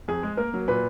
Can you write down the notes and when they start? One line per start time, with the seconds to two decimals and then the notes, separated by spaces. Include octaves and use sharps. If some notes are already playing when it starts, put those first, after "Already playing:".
0.08 F2 G#4
0.23 G#3
0.37 A#3 A#4
0.54 F#3
0.68 A#2 B4